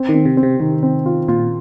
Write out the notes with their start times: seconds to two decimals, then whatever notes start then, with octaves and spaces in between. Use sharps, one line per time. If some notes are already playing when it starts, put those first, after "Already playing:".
Already playing: C4
0.09 D#3
0.14 C4
0.25 C3
0.37 C4
0.43 C3
0.60 C3 D#3
0.83 C4
1.06 F4
1.28 A#2 F4